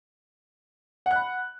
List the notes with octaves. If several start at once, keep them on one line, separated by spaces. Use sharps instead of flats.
F#5 B5 F#6